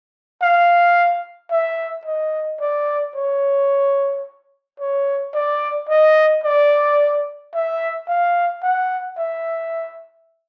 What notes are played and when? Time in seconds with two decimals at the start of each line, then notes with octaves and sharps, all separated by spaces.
0.42 F5
1.51 E5
2.05 D#5
2.60 D5
3.15 C#5
4.80 C#5
5.34 D5
5.89 D#5
6.43 D5
7.54 E5
8.08 F5
8.63 F#5
9.17 E5